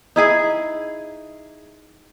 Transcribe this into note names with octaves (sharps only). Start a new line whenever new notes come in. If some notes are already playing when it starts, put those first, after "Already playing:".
D#4 E4 G#4